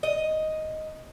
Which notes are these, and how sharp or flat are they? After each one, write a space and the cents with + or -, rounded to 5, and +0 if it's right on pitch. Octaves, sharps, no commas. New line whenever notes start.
D#5 +5